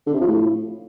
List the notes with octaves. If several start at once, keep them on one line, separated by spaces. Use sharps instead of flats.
D3
C3
F3
A2